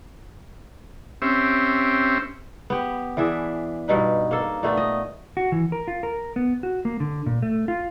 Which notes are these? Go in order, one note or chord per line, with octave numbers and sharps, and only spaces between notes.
C4 C#4 G4 E5
B3 G4
E3 D4 G#4 E5
G2 B2 D#4 B4
A#3 A4
A#2 A3 B3
D#5
F#4
E3
A#4
F4
A#4
B3
F#4
A#3
D3
A#2
A3
F4